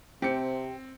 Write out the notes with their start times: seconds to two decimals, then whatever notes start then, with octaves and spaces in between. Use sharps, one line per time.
0.22 C3 C4 G4 C#7